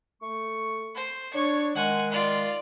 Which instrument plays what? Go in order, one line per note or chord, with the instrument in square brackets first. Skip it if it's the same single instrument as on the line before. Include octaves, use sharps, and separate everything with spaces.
[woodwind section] A3 C#6
[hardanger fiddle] C5
[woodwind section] D4 C#5 [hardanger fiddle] C#6
[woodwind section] D#3 G#3 [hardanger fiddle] F#5 G#5
[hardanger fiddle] F4 D5